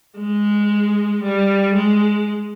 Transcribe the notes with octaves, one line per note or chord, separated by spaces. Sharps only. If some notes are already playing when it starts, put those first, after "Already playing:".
G#3
G3
G#3